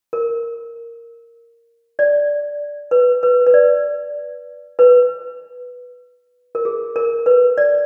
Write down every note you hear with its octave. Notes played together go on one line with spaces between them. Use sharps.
A#4
D5
B4
B4
B4
D5
B4
A#4
G#4
A#4
B4
D5